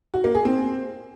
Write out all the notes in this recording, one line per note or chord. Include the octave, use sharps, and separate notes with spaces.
F#4
A#3
G#4
C4